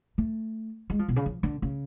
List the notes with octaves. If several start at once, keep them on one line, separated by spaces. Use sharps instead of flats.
A3
G#3
F3
B2
C#3
F3
D3
C#3